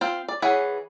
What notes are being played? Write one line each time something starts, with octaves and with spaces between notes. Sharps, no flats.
C4 F4 C5
D5
E3 G#4 C#5 F#5 B5